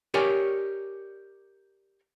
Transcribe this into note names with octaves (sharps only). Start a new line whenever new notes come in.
G4 A#4 C#5 D5 G#5